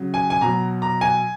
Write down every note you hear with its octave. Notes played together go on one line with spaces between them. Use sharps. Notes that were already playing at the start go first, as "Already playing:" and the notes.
Already playing: C#3 F#3
G#5
G#5
B2 F#3 A#5
A#5
G#5